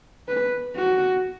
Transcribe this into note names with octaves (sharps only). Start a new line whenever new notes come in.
B4
F#4